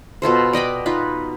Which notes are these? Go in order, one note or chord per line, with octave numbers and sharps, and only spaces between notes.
B2 F4 A4 C5
D5 D#5 G5 B5
D#4 F4 B4